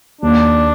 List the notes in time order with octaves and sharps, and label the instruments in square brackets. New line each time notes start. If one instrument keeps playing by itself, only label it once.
[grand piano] D#2 [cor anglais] D4